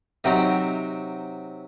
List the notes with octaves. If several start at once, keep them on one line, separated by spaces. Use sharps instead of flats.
C3 F#3 C4 D#4